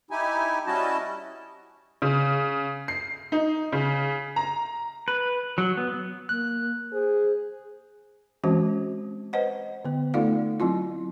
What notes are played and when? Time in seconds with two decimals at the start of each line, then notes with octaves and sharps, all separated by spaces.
0.11 D#4 E4 G4 G#5
0.66 G3 C#4 E4 F#4 D#5 A5
2.02 C#3
2.88 C7
3.32 D#4
3.72 C#3
4.36 A#5
5.08 B4
5.58 F#3
5.77 B3
6.29 A#3 F#6
6.93 G#4 C5
8.44 E3 G#3 C4 C#4 F#4 C5
9.33 B4 C5 D#5 F#5
9.85 D3 B3
10.14 A3 D#4 F4 A4 D5 F5
10.60 F#3 C4 E4 F4